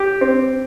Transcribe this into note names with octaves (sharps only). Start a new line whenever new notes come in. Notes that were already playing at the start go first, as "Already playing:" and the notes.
Already playing: G4
C4